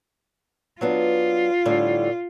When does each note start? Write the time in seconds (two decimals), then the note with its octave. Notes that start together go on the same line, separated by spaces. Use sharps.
0.81 F#3 B3 D4 F4
1.65 A2 D3 G3